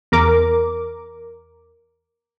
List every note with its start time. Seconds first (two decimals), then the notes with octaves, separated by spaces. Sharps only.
0.12 E2 A#4 D6